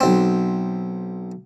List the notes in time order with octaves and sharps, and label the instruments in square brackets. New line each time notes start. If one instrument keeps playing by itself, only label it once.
[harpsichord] B1 C4